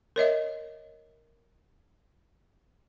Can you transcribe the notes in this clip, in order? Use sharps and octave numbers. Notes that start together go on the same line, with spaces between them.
A#4 C#5 D#5 E5